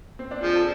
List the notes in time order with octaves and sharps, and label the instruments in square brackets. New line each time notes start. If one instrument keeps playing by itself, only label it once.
[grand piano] C4
D4
[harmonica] F3 [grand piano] G#4
[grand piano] A4